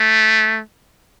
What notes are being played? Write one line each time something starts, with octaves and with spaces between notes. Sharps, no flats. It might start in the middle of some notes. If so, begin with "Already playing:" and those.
Already playing: A3